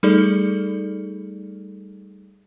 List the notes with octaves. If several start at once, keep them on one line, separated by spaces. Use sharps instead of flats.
G3 A3 D#4 G#4 A4 D5